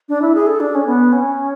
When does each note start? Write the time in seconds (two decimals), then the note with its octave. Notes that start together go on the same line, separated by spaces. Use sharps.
0.09 D4
0.22 E4
0.35 G#4
0.46 A4
0.60 D4
0.75 C#4
0.86 B3
1.13 C#4